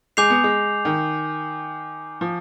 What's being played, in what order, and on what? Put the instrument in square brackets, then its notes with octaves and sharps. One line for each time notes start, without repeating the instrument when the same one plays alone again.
[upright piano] G#3 [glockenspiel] G#5 D6 G6 C7 F7
[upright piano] B3
G#3
D#3
F3